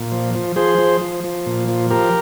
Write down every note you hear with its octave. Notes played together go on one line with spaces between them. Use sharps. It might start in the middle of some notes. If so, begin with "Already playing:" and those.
Already playing: A#2
F3
F3
F3 G#4 C5
F3
F3
F3
A#2
F3
F3 G4 A#4